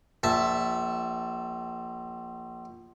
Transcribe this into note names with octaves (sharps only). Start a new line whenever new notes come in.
A#1 E5 A5